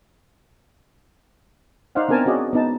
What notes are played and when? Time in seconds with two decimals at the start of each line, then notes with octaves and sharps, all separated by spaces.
1.95 D#4 C5 D5 F5 F#5
2.09 B3 C4 D4 A#4 G#5 A5
2.26 C#4 F#4 G#4 D5 D#5
2.53 B3 D#4 A5